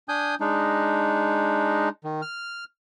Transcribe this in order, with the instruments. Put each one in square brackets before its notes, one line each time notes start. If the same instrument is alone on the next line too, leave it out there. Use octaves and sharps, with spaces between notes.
[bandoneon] D4 G#5 D#6 G6
G#3 D4 D#4
D#3
F6